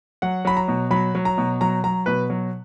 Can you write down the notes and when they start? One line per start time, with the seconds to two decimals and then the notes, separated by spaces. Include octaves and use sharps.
0.22 F#3 F#5
0.45 F#3 B5
0.57 A#5
0.68 B2
0.91 F#3 B5
1.15 F#3
1.25 A#5
1.38 B2
1.61 F#3 A#5
1.84 F#3 A#5
2.06 B2 B4
2.30 F#3